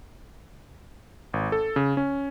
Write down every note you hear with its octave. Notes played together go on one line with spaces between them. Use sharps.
G#1
A4
C#3
C#4